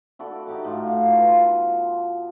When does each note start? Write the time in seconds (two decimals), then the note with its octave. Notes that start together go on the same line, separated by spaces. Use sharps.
0.19 E4 F#4 A4 D5
0.47 D#4 G4 D6
0.64 A2 F4 F#4
0.87 F5
1.08 B2 F4
1.28 F4